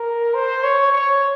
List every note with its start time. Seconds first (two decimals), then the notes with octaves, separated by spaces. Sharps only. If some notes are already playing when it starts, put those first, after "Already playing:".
Already playing: A#4
0.34 C5
0.63 C#5
0.92 C#5